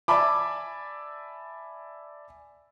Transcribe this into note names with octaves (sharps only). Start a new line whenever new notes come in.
D5 E5 G#5 A5 B5 D6